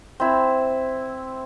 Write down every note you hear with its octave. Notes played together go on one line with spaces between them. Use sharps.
C4 E4